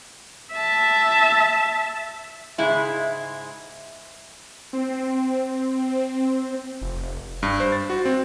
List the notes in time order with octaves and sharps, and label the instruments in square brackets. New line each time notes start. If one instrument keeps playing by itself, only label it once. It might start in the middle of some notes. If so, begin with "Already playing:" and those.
[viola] E5 A5
[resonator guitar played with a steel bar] G#2 C#3 G#3 E4
[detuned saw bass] C4
F1
[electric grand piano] G2
C5
A6
F#4
C4